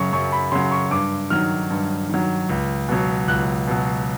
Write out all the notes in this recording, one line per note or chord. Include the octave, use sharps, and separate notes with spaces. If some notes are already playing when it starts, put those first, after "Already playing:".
Already playing: F#2 C#3 F#3 C#6
F#2 C#6
B5
C#3 F#3 C6
C#6
G2 D6
D#3 F#3 F6
G2
D#3 F#3
C#2
B2 F#3
C#2 F#6
B2 F#3